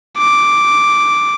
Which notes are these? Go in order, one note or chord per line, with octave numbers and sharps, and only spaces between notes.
D6